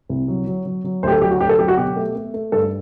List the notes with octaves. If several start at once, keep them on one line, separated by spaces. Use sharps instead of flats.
C2
F#3
F#3
F#3
F#3
D2 G4 C5
A4
F#3 G4
F#4
D2 G4
A4
F#3 G4
F#4
B2 G4
A3
A3
A3
G2 A4